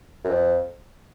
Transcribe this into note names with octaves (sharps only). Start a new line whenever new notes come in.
F#2
F2